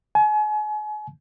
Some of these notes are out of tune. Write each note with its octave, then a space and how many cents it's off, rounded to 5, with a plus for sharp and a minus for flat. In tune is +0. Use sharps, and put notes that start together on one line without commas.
G#5 +35